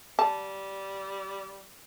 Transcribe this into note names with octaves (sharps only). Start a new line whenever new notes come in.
G3 A5